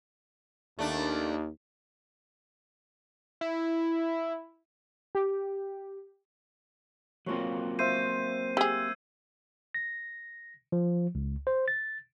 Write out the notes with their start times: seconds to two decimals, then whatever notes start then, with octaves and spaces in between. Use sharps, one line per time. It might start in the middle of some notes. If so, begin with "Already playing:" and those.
0.79 D#2 A3 D4
3.41 E4
5.15 G4
7.26 F#3 A#3 C4 F4 C#5
7.79 C5 E5 F5 G6 C7 D#7
8.57 G4 G#4 E6 G#6
9.74 A#6
10.72 F3
11.15 C#2
11.47 C5
11.68 A6